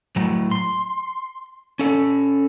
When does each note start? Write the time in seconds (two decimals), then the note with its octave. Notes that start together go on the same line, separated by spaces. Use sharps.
0.16 A2 F#3
0.51 C6
1.79 C#4 A4